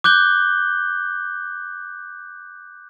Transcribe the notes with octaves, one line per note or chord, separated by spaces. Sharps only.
D6 F#6 G6 G7